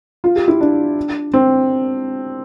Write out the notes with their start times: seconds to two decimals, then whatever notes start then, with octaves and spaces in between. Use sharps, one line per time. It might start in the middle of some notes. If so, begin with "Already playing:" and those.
0.24 F4
0.36 G4
0.48 E4
0.61 D4
1.34 C4